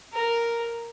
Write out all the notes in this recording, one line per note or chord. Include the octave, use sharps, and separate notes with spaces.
A#4